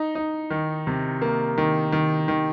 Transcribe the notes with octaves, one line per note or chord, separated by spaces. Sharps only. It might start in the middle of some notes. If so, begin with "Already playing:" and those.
Already playing: D#4
D#4
D#3
C3
A#3
D#3
D#3
D#3